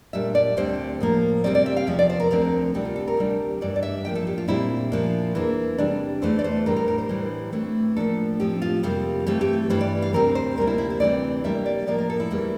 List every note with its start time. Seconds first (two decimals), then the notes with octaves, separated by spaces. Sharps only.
0.13 A#2 G3 D4 E5
0.35 D5
0.57 D2 D3 G3 C4 C5
1.00 A2 F3 A#3
1.44 C3 G3 C4 D5
1.55 D5
1.66 E5
1.77 F5
1.87 E2 C3 F3 E5
1.99 D5
2.10 C5
2.20 A#4
2.31 D2 D3 F3 C4 A#4
2.74 D2 C3 G3 D4 A4
2.85 F4
2.96 A4
3.08 A#4
3.17 D2 C3 G3 D4
3.61 G2 E3 G3 D5
3.76 D5
3.83 E5
4.05 A2 F3 A#3 D4 G5
4.15 A4
4.27 G4
4.38 F4
4.48 A#2 G3 C4 E4
4.92 A#2 F3 A#3 D4
5.35 E2 E3 A#3
5.78 C3 G3 D4
6.22 E2 E3 A3 D4 C5
6.39 D5
6.44 C5
6.66 A2 G3 D4 A#4
6.76 A#4
6.88 A#4
6.98 C5
7.09 A2 E3 G3 D4
7.53 A2 E3 A3 C4
7.96 A2 F3 A#3 D4 A4
8.40 A2 F3 C4 G4
8.62 F4
8.83 F2 C3 G3 A#3 F4
9.27 G2 E3 A3 C4 G4
9.41 G4
9.70 G2 E3 G3 D4 C5
9.81 D5
10.02 F5
10.13 D2 C3 G3 C4 A#4
10.35 C5
10.57 D2 C3 G3 A#3 A#4
10.67 E4
10.78 E4
10.90 E4
11.00 D2 C3 E3 G3 C4 D5
11.44 C3 G3 A#3 D4 E5
11.66 D5
11.87 A2 F3 A#3 D4 D5
11.99 A#4
12.10 A4
12.20 E4
12.31 E2 E3 G3 A#3